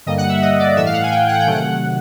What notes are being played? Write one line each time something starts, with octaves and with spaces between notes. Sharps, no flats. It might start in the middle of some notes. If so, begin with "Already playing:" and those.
G2 D3 G3 A#3 D#5
F#5
E5
D#5
D5
A2 E3 A3 E5
F5
F#5
G#5
G5
F#5
G5
C3 D#3 F#3 A3 F#5